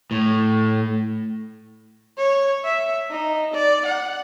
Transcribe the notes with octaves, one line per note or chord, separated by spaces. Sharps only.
A2
C#5
E5
D#4
D5
F#5